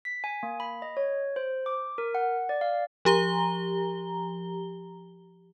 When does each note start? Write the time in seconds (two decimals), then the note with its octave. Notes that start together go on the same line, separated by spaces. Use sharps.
0.05 B6
0.24 G#5
0.43 A#3
0.60 B5
0.82 D#5
0.97 C#5
1.36 C5
1.66 D6
1.98 A#4
2.15 F#5
2.49 D5
2.61 F5
3.05 F3 G4 A#5 G7